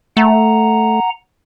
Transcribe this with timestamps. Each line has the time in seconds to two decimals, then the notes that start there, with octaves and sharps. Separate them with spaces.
0.17 A3 F#5 A#5